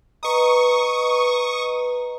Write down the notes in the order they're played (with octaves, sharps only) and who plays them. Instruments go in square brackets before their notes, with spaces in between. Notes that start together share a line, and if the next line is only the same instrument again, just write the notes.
[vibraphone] B4 D#5 A#5 [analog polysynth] C#6 D#6